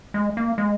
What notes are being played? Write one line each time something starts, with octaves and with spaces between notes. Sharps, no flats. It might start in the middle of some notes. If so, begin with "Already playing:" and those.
G#3
A#3
G#3